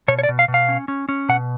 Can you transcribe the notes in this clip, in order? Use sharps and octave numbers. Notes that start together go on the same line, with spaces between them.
B2 C#5
C#5
D5
B2
F5
B2
F5
C#4
C#4
C#4
B2 F#5